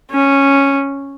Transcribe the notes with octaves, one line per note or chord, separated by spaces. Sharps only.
C#4